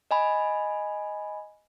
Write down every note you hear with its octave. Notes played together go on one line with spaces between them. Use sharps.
D#5 G#5 B5